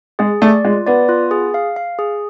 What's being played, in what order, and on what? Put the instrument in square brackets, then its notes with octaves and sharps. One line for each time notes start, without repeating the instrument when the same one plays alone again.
[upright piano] G#3 [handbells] G#4
[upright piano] A3 [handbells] D5
[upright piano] G#3 [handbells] F4
[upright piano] B3 [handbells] D5
[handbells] F4
G#4
F5
F5
G#4